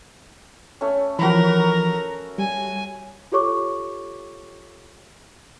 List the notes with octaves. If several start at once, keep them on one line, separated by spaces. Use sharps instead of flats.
A3 C#4
E3 F3 F#4 A#4 A#5 B5
G3 G#5
F4 G4 A4 C#5 C#6 D6